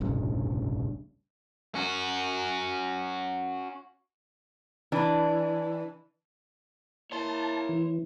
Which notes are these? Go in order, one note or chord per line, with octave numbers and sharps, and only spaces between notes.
F1 A#1 G2 C#3
C#4 F#4
E3 D4
A#3 E4 C#5 A5 C6
E3